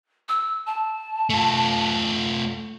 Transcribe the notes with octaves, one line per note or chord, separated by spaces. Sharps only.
E6
A5
A3 F4